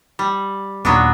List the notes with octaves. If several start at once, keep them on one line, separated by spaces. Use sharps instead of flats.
G3
D#2 A#2 F#3 B3 D4